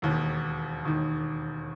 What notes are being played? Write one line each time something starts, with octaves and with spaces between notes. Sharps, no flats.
E1 D#2 D#3
E1 D#2 D#3